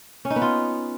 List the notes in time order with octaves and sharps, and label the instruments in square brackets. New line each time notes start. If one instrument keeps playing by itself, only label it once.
[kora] C#4
D#4
B3
F4